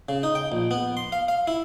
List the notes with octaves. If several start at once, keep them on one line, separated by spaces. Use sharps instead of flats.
C#3
D#4
G5
A#1
B3
C6
F5
F5
E4